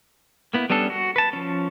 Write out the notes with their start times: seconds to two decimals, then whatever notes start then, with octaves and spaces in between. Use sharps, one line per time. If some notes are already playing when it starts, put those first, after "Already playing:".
0.53 A#3 B3 E4
0.70 G3 B3 C#4 D4 A4
0.90 F#4
1.16 B4 A5
1.33 F3 C#4